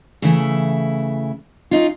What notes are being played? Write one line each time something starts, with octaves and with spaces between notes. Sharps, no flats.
C#3 E3 A3 E4
C#4 D#4 F4